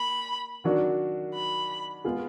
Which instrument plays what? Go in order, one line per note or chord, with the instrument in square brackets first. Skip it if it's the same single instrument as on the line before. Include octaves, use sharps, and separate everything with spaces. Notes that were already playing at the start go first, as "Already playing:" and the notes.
Already playing: [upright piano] A#3 [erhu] B5
[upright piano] D#3 F#3 D4 F#4
[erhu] B5
[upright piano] G#3 B3 F4 G#4